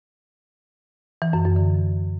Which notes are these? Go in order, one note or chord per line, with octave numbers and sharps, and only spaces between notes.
E3
F#2
F#2
D3